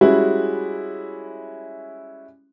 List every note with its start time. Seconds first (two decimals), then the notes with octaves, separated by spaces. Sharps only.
0.01 G3 G#3 C#4 E4 F#4